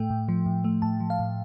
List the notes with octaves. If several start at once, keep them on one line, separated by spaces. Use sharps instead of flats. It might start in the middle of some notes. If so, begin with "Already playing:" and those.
Already playing: A2 A3 G5
A2
F3
A2
A3
A2 A5
F3
F5
A2